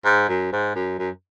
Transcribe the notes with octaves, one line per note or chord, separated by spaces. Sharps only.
G#2
F#2
G#2
F#2
F#2